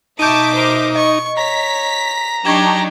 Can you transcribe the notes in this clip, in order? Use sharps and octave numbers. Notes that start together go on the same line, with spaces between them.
B2 D#4 E5 A5 C#6 D6 G6 D#7
A#4 C5
D#5 C#6
C#5 A#5 B6
F#3 D4 D#4 G4 C#6 G#6 E7